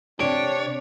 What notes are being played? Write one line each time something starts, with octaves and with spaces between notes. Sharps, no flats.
C3 D4 G4 C#5 D7